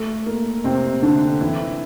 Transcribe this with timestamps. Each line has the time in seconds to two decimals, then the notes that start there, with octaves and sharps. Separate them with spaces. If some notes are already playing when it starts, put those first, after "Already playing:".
Already playing: A3
0.26 A#3
0.64 C3 C4
1.02 D3 D4
1.41 E3 E4